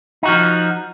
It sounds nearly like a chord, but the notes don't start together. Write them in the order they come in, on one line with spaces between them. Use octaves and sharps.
D#4 F#4 F3